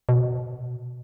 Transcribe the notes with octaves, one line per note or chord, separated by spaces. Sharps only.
B2